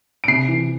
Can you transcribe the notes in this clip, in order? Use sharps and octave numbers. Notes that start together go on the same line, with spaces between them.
D7
C3 C7
E3